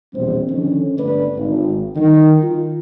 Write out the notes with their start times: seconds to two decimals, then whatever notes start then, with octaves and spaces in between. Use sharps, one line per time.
0.14 A#1 E2 B2 G3 C4
0.49 F2 D3 D#3 C#4
0.99 G1 D3 A3 B4 D5
1.36 G#1
1.96 D#3 G3
2.43 F4